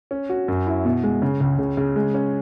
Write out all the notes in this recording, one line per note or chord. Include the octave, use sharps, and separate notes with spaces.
C#4
F#4
F#2
E4
B2
G#3
C#3
C#2
C#3
C#3
G#3
C#4